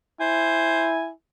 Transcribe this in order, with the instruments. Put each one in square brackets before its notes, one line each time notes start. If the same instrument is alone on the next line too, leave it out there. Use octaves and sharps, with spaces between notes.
[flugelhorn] E4 [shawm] C5 [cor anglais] G#5